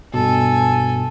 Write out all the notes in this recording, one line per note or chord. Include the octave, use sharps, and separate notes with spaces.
G2 B2 A4 G#5